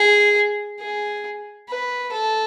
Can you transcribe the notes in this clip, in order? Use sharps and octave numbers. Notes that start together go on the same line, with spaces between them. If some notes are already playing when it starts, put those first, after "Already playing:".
Already playing: G#4
G#4
B4
A4